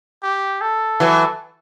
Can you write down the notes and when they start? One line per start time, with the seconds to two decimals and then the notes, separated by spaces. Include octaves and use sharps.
0.23 G4
0.61 A4
1.00 E3 F#3